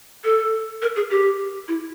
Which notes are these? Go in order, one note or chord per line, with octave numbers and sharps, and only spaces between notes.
A4
A#4
G#4
G4
E4